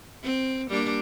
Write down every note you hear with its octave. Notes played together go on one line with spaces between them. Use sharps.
C4
G3 A#3 D4